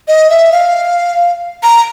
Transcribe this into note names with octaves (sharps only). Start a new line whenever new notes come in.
D#5
E5
F5
A#5